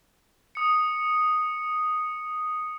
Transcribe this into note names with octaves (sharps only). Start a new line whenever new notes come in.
D#6 C#7